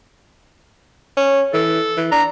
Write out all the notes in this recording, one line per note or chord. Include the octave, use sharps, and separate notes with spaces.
C#4
E3 A4
E3
D4 A#5